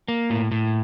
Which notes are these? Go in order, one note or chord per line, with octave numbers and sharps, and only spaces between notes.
A#3
A2
A2